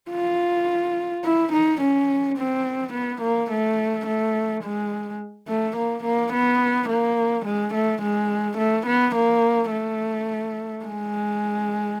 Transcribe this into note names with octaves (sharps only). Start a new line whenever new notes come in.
F4
E4
D#4
C#4
C4
B3
A#3
A3
A3
G#3
A3
A#3
A#3
B3
A#3
G#3
A3
G#3
A3
B3
A#3
A3
G#3